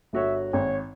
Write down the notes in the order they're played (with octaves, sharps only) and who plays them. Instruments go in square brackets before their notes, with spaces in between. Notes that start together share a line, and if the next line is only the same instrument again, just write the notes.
[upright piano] G1 F#4 C#5 [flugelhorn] E5
[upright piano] G#1 [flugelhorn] C#5